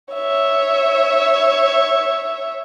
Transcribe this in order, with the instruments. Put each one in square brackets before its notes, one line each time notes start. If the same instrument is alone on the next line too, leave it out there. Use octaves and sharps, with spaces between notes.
[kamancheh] C#5 E5